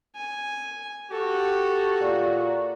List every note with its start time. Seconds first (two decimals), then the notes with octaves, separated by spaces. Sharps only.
0.15 G#5
1.11 F#4 G4 A4
2.01 A#2